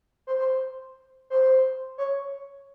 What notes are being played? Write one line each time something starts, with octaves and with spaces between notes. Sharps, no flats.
C5
C5
C5
C#5